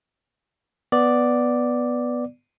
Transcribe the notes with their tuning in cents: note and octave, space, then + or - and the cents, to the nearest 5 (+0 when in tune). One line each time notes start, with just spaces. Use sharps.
B3 +0 D5 +0